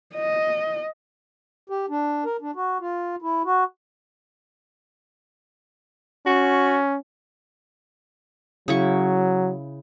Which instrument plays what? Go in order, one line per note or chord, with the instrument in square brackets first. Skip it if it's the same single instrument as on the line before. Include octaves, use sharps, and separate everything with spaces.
[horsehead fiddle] D#5
[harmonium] G4
D4
A#4
D4
F#4
F4
E4
F#4
[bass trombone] C#4 [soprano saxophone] F#4
[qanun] C#3 E4 C#6 [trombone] F#3